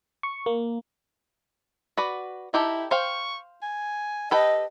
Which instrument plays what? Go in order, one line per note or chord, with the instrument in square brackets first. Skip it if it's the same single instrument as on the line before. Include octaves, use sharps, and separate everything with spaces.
[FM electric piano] C#6
A#3
[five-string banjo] F#4 B4 D5
[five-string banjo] D#4 G4 A4 [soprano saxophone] E4
[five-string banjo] C5 F5 G5 [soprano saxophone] C#6
[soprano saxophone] G#5
[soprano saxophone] G4 [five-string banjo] A4 B4 G5 [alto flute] D#5